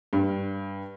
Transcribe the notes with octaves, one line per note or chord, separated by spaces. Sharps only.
G2